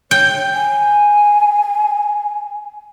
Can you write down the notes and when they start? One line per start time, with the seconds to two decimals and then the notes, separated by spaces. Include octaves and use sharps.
0.11 C#5 G5
0.54 G#5